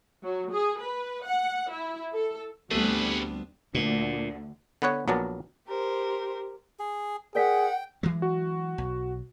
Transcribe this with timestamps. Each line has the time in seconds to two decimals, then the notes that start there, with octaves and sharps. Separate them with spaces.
0.23 F#3
0.52 G#4
0.80 B4
1.25 F#5
1.71 E4
2.13 A4
2.71 D2 G3 A3 B3 C4 D4 G#4 B4
3.75 D2 A#2 D3 D4
4.82 D3 B3 B4 C#5 F#5
5.08 A#1 F#3 B3 A#4 D5 A5
5.67 G4 A#4 C5
6.79 G#4
7.35 G#4 A#4 D5 F#5 G5 B6
8.03 E3 F#3 G#3
8.22 F#4
8.78 B1